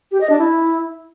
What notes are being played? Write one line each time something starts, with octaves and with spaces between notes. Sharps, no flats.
G4
D#5
D4
E4